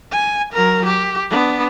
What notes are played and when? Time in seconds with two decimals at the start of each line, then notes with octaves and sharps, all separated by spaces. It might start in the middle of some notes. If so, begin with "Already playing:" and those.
0.12 G#5
0.53 F#3 A#4
0.86 G4
1.30 B3 D4